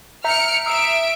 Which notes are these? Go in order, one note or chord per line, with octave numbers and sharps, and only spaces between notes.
E5 A#5 F6 G6 C#7 D7
E5 D#6 E6 C7 D7